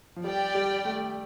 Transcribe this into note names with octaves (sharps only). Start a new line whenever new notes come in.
F3
G3 G4 D5 G5
G3
A3